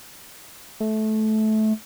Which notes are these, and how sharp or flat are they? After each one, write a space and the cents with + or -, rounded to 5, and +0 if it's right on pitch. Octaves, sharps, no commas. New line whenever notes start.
A3 -20